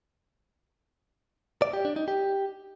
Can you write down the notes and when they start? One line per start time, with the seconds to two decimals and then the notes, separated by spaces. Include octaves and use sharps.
1.62 D5
1.73 G4
1.85 D4
1.96 D#4
2.08 G4